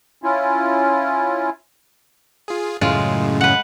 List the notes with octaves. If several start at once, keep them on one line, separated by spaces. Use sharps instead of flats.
C#4 E4 F4
F4 G#4
F#2 A2 C#3 G#3 F4
B4 F#5